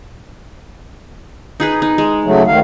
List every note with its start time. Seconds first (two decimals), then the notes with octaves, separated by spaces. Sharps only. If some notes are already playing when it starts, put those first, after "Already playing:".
1.60 D#4 G#4 B4
1.82 D#4
1.98 G#3
2.24 C#3 F#3 A3
2.47 D2 D#3 F5